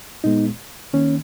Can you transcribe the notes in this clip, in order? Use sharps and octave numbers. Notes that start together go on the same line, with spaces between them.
A#2 G#3 B3 D#4
D#3 A#3 C#4